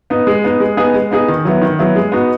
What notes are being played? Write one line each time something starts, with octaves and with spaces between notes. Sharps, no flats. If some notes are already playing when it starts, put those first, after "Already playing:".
B3 D#4
G#3
B3 D#4
G#3
B3 D#4 G#4
G#3
B3 D#4 G#4
D#3
F#3 B3 E4
D#3
F#3 B3 E4
G#3
B3 D#4 F#4